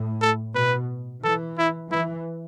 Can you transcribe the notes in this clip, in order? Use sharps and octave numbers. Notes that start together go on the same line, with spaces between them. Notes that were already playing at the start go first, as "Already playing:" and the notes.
Already playing: A2
A4
B2 B4
E3 A4
E4
E3 E4